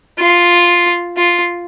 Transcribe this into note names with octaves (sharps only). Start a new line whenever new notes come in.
F4
F4